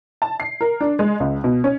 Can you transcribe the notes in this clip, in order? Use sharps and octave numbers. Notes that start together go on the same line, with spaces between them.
A5
C7
A#4
D4
G#3
C#2
B2
C#4